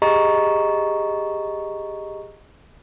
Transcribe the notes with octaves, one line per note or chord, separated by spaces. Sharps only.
G4 G#4 D#5 A#5 C#6